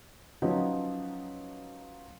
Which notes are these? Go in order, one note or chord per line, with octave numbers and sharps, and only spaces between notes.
F3 F#3 B3 C#4 D#4